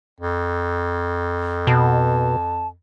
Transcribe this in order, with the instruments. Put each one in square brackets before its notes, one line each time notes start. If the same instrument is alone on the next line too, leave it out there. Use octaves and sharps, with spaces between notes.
[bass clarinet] F2
[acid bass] B2 [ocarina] A5